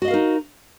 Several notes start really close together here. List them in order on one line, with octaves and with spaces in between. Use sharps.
F#4 D#5 F5 A#4 D#4